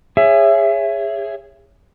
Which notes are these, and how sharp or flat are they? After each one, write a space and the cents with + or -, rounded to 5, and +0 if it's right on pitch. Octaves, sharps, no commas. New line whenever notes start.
G#4 -20 C#5 +0 E5 +20